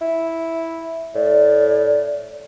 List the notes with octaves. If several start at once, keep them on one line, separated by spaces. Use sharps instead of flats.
E4
A2 D5